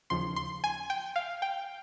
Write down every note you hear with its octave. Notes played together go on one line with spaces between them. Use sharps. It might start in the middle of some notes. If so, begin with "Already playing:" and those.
D#2 C#3 F3 C6
C6
G#5
G5
F5
G5